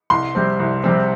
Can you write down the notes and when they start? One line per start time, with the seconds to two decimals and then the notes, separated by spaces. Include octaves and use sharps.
0.10 C2 C6
0.35 C3 G3 C4
0.60 C2
0.84 C3 G3 C4